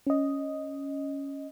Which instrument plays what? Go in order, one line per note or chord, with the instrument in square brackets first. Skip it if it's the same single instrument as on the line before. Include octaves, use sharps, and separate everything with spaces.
[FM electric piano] C#4 D#5